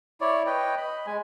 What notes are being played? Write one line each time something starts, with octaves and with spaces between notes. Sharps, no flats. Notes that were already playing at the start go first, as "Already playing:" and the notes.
E4 C#5 D5
B4 C#5 D#5 G5
D#5 B5
G#3 G#5